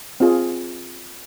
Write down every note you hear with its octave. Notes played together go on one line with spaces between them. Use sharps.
C4 F4 G#4